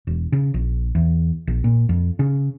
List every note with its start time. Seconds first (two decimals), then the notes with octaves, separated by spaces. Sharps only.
0.07 E1
0.32 C#3
0.54 A#1
0.95 E2
1.47 A#1
1.64 A#2
1.89 F2
2.19 C#3